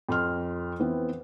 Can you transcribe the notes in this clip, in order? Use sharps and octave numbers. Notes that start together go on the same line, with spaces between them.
F2 C6 F6
E3 B3 C4